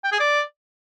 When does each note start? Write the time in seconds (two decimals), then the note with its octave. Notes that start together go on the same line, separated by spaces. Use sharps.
0.04 G5
0.12 G#4
0.20 D5